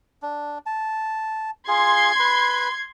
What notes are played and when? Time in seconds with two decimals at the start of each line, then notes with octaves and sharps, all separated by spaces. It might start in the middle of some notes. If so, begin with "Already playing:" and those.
0.22 D4
0.66 A5
1.68 F4 G#4 C6 G#6
2.20 B4 B5